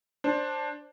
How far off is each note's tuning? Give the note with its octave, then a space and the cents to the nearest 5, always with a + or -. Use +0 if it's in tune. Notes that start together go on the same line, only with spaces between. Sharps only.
D4 +0 C5 +15